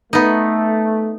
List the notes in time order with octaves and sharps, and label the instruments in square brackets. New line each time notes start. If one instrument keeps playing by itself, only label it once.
[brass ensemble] A3 [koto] B3 D#4